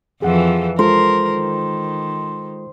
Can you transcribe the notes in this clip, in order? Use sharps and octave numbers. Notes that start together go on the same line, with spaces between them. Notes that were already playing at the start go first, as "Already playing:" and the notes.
F2 E3 F3 G#4 F#5
G#3 F4 A4 A#4 C5
D#3